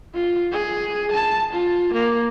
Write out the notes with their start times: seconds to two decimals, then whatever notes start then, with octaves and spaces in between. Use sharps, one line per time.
0.15 F4
0.52 G#4
1.12 A5
1.53 F4
1.93 A#3